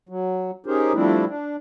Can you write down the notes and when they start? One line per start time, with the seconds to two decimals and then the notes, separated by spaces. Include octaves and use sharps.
0.09 F#3
0.66 C#4 D#4 G4 G#4 A#4 C5
0.93 F3 G3 A3 C4 D4 E4
1.27 D4